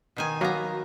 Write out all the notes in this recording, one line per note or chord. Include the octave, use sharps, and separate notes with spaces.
B2 D#3 G#5
F#3 A#3 B3 A#5